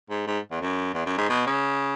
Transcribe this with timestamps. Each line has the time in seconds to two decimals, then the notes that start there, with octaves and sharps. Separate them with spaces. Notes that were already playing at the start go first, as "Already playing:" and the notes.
0.10 G#2
0.27 G#2
0.51 E2
0.61 F#2
0.94 E2
1.06 F#2
1.18 G#2
1.30 B2
1.47 C#3